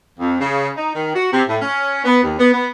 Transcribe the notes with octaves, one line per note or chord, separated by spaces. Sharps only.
F2
C#3
D#4
D#3
F#4
C3
A2
C#4
B3
D#2
B3
B3